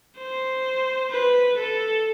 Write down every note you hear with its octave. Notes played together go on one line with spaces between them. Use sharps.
C5
B4
A4